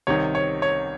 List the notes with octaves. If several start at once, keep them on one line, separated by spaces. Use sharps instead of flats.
C2 C3 D#3 C#5
C#5
C#5